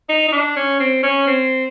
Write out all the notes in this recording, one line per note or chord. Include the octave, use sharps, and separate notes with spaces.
D#4
D#4
D4
C#4
C4
C#4
C4